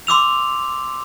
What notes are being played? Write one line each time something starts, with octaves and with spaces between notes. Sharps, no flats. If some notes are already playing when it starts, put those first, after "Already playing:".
C6 D6 E6 F7